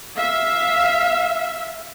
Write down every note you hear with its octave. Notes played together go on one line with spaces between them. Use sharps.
E5 F5